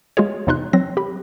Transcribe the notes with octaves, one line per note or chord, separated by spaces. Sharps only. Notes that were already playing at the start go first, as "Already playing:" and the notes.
G#3 F4 F#4 G#4 C#5
E2 C3 D#4 F4 C6 F#6
F#3 C4 A#6
G4 B5